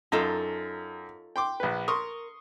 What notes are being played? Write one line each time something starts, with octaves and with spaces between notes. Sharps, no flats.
F#2 D#4 F4 A4
G5 C6 D6
A#1 B4
A#4 C6 C#6 D#6